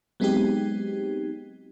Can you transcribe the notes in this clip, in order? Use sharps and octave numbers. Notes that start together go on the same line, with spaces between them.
F#3 G#3 B3 C4 D#4 G4